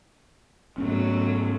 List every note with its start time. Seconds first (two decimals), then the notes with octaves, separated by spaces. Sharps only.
0.78 G#2 F#3 A3 B3 C#4